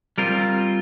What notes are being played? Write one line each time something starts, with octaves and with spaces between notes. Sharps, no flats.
G3 C4 F4 A#4